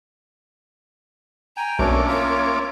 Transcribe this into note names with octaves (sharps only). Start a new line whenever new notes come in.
G5 G#5 A#5
B1 A3 A#3 C#4 D4 C#5 D6
F4 C#5 E5